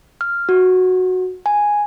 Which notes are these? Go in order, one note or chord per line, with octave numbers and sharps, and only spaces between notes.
F6
F#4
G#5